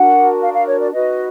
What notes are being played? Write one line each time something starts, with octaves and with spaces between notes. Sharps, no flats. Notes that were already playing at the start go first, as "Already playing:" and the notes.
Already playing: D4 F#4 A#4 F#5
F5
F5
C#5
D5
D#4 F#4 B4 D#5